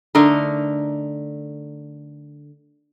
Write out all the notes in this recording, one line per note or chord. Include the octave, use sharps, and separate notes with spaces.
D3 A3 D#4 A#4